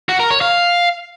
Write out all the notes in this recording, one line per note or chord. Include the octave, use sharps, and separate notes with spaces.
F#4
A#4
C#5
F5